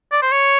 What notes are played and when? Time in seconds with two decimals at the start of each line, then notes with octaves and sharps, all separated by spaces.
0.12 D5
0.22 C5
0.31 C#5